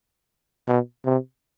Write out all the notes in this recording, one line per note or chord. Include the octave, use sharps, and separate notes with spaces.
B2
C3